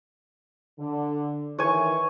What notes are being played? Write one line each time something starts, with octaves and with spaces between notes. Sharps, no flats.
D3
D#3 E3 C#5 G#5 C#6